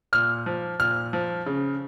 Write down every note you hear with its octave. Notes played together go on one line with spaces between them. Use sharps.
A#2 F6
F3
A#2 F6
F3
C#3